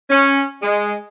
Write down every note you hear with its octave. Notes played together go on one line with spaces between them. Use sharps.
C#4
G#3